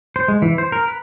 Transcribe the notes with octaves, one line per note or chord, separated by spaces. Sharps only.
C5
G#3
E3
C5
A#4
B4